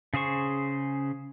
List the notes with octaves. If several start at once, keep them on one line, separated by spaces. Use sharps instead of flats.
C#3 G#4 C5 C#6